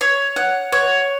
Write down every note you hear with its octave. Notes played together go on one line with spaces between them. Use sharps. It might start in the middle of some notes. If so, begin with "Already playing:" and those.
C#5
F#5
C#5